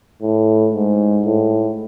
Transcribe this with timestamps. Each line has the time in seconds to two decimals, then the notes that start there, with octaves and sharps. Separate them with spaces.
0.22 A2
0.74 G#2
1.25 A2